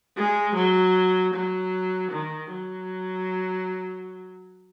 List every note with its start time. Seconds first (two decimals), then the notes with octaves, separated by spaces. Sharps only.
0.17 G#3
0.55 F#3
1.34 F#3
2.12 D#3
2.51 F#3